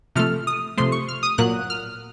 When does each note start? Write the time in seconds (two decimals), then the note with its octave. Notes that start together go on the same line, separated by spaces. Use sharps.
0.16 C3 F3 A3 F6
0.47 D#6
0.77 C3 F3 A3 C6
0.92 C#6
1.08 F6
1.23 D#6
1.38 A#2 F#3 A#3 F#6
1.70 F6